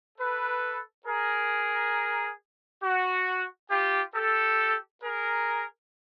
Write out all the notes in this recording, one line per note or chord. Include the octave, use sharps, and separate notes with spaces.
A4 B4
G#4 A#4
F#4
F4 G4
G4 A4
G#4 A#4